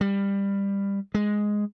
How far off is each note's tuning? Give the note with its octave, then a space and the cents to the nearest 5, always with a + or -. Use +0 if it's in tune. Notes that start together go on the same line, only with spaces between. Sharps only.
G3 +20
G#3 +0